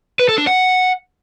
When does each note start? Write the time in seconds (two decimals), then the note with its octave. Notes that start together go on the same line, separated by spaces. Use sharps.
0.19 B4
0.29 A4
0.38 D4
0.47 F#5